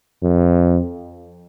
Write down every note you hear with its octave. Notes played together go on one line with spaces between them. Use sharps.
F2